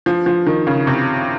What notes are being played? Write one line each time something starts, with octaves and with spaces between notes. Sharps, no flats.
F3
F3
D#3
C#3
C3